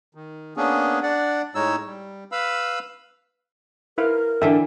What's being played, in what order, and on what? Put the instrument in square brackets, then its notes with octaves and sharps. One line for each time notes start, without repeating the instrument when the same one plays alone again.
[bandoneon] D#3
A#3 B3 C#4 D4 G#4
D4 D5 F#5
A2 G#3 D#4 C#5 E6
G3
B4 F5 B5 E6
[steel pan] E4 B4 F5 [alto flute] A#4
[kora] D3 E3 E4 [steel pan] A4 E5 G5